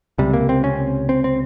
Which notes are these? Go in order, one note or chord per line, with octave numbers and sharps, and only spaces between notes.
C#2 C3 G3
A#3
C4
C#4
C4
C4